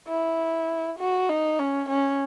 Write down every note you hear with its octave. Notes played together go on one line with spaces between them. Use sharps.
E4
F#4
D#4
C#4
C#4